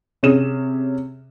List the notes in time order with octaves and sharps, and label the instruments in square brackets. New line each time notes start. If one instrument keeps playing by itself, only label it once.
[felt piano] C3 C#4 G#4 E7